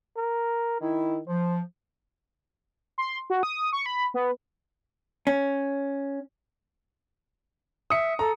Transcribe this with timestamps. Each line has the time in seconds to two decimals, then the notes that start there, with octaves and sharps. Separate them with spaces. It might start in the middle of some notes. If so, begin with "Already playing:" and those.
0.17 A#4
0.81 D#3 E4
1.28 F3 C5
2.98 C6
3.30 F#4
3.43 D#6
3.73 C#6
3.86 B5
4.14 B3
5.27 C#4
7.90 E5 D#6 C#7
8.19 A4 A#5